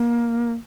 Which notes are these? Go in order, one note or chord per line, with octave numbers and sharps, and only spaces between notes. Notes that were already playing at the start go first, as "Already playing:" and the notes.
Already playing: A#3